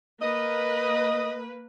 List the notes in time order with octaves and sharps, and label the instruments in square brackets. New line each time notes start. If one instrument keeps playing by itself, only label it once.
[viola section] A#3 B4 [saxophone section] D#5